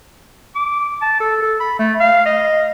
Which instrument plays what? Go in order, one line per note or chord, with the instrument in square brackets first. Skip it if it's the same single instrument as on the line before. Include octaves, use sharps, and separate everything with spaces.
[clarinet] D6
A5
A4
A4
B5
A3
F5
D#5